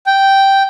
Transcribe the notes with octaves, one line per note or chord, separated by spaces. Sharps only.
G5